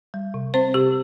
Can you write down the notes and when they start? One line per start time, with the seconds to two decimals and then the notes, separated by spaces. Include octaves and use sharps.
0.14 G3
0.34 C3
0.54 C4 C5
0.74 C3 G4